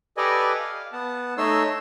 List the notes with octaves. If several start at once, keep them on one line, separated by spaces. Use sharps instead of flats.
G4 A4 B4 D5 D#5 G#5
F5
B3 F#5 A5
A3 D#4 C#5 C6 E6